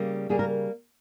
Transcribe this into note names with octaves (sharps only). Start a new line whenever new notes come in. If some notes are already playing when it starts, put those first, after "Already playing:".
Already playing: C#3 G3 A#3
C#3 G3 A#3 G#4
A#4